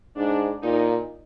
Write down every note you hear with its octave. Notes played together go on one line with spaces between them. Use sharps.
G#2 D4
A#2 D#4